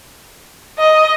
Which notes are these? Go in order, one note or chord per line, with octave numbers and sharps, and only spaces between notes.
D#5